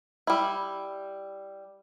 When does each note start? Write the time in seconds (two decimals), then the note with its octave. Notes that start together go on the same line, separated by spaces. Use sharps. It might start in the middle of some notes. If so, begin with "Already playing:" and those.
0.27 G3 E4